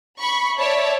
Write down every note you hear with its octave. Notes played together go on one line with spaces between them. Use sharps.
B5 C#6
C#5 D5 E5 A5